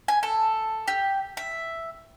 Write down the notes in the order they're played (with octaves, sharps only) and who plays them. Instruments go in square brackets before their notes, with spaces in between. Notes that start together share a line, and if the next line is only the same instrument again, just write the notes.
[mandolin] G#5
A4
G4
E5